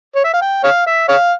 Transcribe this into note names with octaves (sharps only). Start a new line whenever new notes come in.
C#5
E5
F5
G5
C#5 F5
E5
C#5 F5